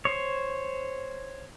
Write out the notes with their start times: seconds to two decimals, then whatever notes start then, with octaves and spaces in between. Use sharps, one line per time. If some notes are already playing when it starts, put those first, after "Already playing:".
0.05 C5 C#5